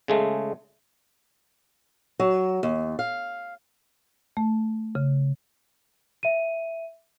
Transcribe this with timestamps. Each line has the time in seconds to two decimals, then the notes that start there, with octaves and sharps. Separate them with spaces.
0.08 C#3 G#3 A3
2.19 F#3
2.63 D#2
2.99 F5
4.37 A3
4.95 C#3
6.23 E5 D#7